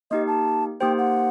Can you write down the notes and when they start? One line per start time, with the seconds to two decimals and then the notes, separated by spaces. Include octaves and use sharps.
0.11 A#3 D#4 G4 D#5
0.27 A5
0.80 A#3 D#4 G4 C5 G5
0.98 F#5